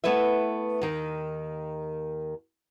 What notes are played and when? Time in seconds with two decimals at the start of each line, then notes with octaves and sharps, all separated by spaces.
0.04 A3 B3 E4 B4 E5
0.81 D#2 D#3